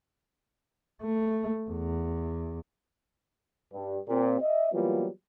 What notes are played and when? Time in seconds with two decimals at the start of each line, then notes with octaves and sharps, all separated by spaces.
1.02 A3
1.69 E2
3.73 G2
4.09 A#2 C4 G4
4.41 D#5 E5
4.73 E3 F#3 G3 A#3 B3 F4